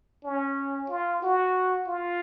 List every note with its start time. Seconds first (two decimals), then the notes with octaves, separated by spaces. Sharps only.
0.24 C#4
0.90 F4
1.22 F#4
1.88 F4